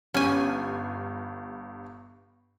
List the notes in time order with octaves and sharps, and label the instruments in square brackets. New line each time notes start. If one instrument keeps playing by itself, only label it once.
[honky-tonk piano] G1 G2 [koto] C#4 G#5